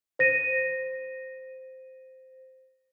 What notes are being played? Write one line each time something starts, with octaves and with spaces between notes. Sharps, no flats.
C5 A#6 D#7